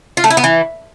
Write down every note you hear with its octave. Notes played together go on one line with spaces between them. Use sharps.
F4
A3
E4
B3
E3